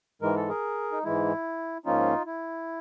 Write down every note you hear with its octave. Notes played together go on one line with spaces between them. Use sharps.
G#2 E3 G#3 A#4
A4
G#4 A#4
D#4
G#2 E3 G#3 E4
G#2 F3 A#3 C#4 D#4 F4
E4